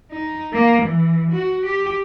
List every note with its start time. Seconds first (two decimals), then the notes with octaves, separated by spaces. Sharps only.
0.11 D#4
0.53 A#3
0.82 E3
1.31 F#4
1.66 G4